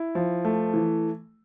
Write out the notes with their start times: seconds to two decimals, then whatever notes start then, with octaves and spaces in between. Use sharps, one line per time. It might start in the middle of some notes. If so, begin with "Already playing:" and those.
Already playing: E4
0.15 F3
0.45 A3
0.74 E3